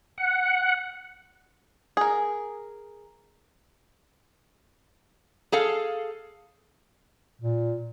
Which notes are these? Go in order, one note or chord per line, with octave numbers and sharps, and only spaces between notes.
F#5
G#4 A#4
G#4 A4 F5
A#2